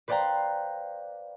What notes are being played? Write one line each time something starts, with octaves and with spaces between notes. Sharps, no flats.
B4 C5 D5 F5 G5 A#5